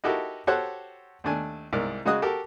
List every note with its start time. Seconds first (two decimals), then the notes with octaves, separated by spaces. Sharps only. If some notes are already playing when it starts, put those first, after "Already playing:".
0.04 D#4 E4 F#4 G4 A4 A#4
0.47 F#4 G4 A4 C5 C#5 F#5
1.24 D#2 A3 D4 G#5
1.73 C2 G#2 A#4 D5
2.05 C#3 G#3 F#4 D#5 D#6 F#6
2.22 F#4 G4 A4 A#4